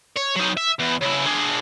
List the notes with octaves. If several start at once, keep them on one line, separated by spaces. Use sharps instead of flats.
C#5
F#3 D#4
E5
E2
C#3 E4
D4 G#4